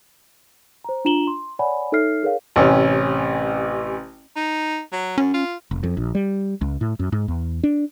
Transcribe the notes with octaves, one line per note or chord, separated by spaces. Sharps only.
C5 A#5
D4 F4 A#5 E7 F#7 G7
C6
C#5 D5 F#5 G#5 B5
D#4 A4 C#5 E5 F6 C7
G#4 A#4 C#5 F5
A1 C3 C#4
D#4
F#3
F#2 C#4
F4
F1
F2
A#1
G3
C#2
A2
F#2
G#2
E2
D4